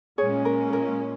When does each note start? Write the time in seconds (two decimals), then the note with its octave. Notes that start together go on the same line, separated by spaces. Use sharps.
0.18 A#2 G#3 C#4 G#4 C#5
0.45 A#4
0.73 A#4